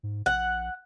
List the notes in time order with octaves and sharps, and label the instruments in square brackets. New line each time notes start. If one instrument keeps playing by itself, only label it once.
[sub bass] G#2
[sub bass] A#1 [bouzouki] F#5